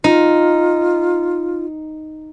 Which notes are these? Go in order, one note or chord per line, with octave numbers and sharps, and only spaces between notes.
D#4 F4